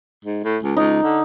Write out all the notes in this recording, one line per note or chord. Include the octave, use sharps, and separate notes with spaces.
G#2
A2
C#2
C#2 D#4
D3